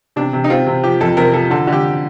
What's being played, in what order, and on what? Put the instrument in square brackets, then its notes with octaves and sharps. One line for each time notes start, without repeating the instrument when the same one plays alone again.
[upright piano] C3 [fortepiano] D4
[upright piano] C3
[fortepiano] D#4
[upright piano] C4 [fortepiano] F4
[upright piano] C3
[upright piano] F3 [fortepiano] G4
[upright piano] F2 [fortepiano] A4
[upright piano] C3 [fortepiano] A#4
[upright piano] F3 [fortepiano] A4
[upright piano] D3 [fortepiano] A4
[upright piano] D3
[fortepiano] G4